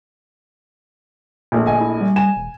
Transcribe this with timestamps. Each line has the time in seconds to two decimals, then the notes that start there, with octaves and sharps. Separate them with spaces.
1.52 A#1 A3
1.66 G1 D#5 G#5
1.80 E4
2.00 G3
2.16 G#5 E7
2.36 E1